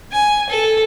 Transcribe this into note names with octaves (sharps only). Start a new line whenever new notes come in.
G#5
A4